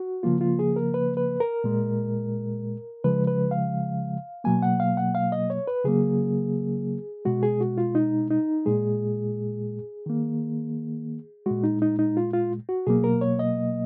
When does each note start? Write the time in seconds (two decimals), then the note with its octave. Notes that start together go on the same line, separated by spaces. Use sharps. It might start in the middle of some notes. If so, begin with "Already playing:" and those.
Already playing: F#4
0.23 C#3 F3 A#3 F4
0.41 F4
0.59 G#4
0.76 A#4
0.94 B4
1.17 B4
1.40 A#4
1.64 A#2 G#3
3.04 C#3 F3 G#3 B4
3.27 B4
3.51 F5
4.44 B2 F#3 A#3 G#5
4.62 F#5
4.80 F5
4.97 F#5
5.15 F5
5.32 D#5
5.50 C#5
5.67 B4
5.84 C#3 F#3 A#3 G#4
7.25 B2 G#3 F#4
7.43 G#4
7.60 F#4
7.78 F4
7.95 D#4
8.31 D#4
8.66 A#2 G#3 G#4
10.06 D#3 A#3
11.46 A#2 G#3 F#4
11.64 D#4
11.82 D#4
11.99 D#4
12.17 F4
12.34 F4
12.69 F#4
12.87 B2 F#3 A#3 G#4
13.04 A#4
13.21 C#5
13.39 D#5